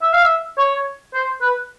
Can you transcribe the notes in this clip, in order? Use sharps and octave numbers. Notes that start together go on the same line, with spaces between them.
E5
F5
E5
C#5
C5
B4